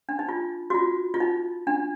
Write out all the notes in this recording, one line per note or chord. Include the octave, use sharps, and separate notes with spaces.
D4
D#4
F4
F#4
F4
F4
D#4
D4